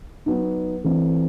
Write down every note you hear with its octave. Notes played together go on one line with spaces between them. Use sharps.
F#3 B3 D#4
E3 A3 C4